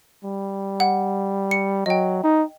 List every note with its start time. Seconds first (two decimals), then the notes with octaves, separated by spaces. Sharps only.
0.24 G3
0.80 F#5
1.51 C#7
1.86 F#3 D#5 G5
2.24 D#4